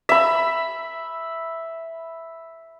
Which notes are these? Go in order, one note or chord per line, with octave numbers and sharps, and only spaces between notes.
E5 B5